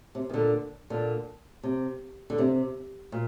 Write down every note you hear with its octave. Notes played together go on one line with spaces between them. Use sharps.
C3
D#3
A#2 D3
A#2 D3
C3
D3
C3
A#2